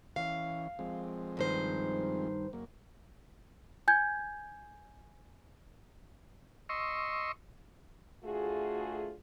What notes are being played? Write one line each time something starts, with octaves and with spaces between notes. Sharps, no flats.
E3 C#4 F5
F3 G#3 C4
G2 D#3 C5
F#2 A#3
G#5 G6 G#6
D#5 C6 C#6 E6
D2 A3 F4 F#4 G#4